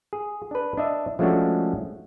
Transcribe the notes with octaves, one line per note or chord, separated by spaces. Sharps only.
G#4
D4 B4
D4 D#5 E5
F3 G#3 A3 C#4 D4 F#4